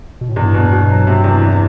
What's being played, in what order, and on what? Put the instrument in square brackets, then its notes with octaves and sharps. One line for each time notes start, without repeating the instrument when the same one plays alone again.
[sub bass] B2
A2
[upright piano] E2 [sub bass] G2
[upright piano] B2
B2
F#3
C3
E2
E3